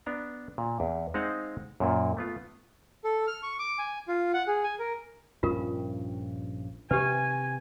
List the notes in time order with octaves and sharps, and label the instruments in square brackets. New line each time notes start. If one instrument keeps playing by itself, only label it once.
[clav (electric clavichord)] B3 D4 A#5
A#2
E2
G#3 C4 D#4 C5 F5 F#5
F#2 A#2 A#3
A3 B3 F4
[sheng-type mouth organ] A4
F6
C#6
D6
G#5
F4
F#5
G#4
G#5
A#4
[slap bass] A#1 G2 C#4 [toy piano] F4 A#4
[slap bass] C3 [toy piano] G4 B4 [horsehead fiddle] G#5